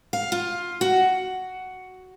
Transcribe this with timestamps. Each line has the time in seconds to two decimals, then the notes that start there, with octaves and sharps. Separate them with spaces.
0.13 F5
0.32 F4
0.81 F#4